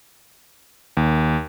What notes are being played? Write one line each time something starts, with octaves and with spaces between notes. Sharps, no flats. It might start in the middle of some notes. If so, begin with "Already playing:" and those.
D#2